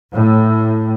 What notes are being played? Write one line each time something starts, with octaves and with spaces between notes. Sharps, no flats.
A2